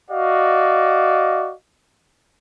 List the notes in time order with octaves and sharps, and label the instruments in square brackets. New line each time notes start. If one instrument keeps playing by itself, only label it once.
[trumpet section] F#4 D5 D#5 F5